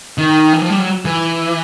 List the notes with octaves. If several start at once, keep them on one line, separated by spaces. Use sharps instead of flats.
D#3
E3
F3
G3
F#3
E3